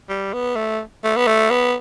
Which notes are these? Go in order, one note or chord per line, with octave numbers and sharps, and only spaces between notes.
G3
B3
A3
A3
B3
A3
B3